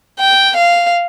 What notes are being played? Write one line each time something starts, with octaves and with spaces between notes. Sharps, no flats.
G5
F5